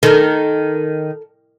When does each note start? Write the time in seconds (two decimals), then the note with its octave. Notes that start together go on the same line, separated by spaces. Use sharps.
0.03 D#3 A4 A#4